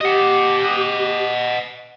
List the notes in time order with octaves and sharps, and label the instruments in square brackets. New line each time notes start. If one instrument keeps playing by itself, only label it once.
[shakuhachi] G4 [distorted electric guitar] D#5 F#5